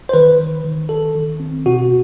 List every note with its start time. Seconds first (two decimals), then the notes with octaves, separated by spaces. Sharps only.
0.09 C5
0.13 D#3 B4
0.39 D#3
0.64 D#3
0.89 D#3 A4
1.15 D#3
1.40 C4
1.66 B2 F#4